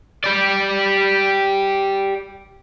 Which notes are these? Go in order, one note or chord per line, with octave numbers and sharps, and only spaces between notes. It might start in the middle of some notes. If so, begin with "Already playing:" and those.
G4 D5